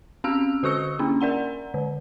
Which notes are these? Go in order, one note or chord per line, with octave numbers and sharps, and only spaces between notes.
C4 C#4 F5 E6 F6 F7
D3 F#4 A4 C#6 E6 C#7
A#3 C#4 D4
A#4 D5 F#5 A#5
D3